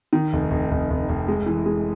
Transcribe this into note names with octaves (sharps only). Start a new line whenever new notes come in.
D#3
F1
F1
F1
F1
F1
G#3
E3
G#3